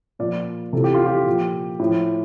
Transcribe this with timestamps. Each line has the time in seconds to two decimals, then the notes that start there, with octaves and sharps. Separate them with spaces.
0.19 A#2 F3 D5
0.73 C3 E3 A4
0.84 G4
0.94 F4
1.06 G4
1.27 A#2 F3
1.79 A2 F3